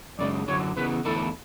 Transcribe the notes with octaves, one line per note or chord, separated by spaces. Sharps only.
F#2 C#3 G#3 D5
F#2 D3 F#3 C#5
C#3 E3 B3 B4
E2 D3 A3 E4 A4